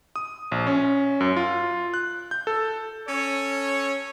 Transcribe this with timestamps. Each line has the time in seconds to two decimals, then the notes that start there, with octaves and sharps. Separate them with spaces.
0.16 D#6
0.52 A#1
0.67 C#4
1.20 F#2
1.37 F4
1.94 F#6
2.31 G6
2.47 A4
3.07 C#4 A4 C#5